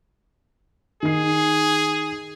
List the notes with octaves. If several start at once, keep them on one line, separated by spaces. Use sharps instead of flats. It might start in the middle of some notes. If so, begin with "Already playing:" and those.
D#3 G#4 C7